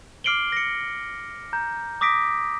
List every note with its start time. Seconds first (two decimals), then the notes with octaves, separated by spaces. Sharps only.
0.24 D6 F6 C7 D7 F#7 G7
0.52 A#6 C#7
1.53 A#5 G6
2.01 D6 D#6 A#6 B6 D7